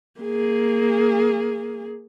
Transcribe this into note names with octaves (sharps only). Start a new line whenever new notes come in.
A#3 G#4